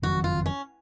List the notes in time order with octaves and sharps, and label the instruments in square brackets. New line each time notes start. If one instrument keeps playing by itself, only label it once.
[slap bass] F#1 F2 D#3 F#3 [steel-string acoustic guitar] F#4
[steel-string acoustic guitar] F4
C#4